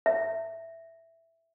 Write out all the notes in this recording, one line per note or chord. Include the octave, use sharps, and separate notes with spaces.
E5